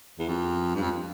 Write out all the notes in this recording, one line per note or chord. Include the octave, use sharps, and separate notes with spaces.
E2
F2
G2
F2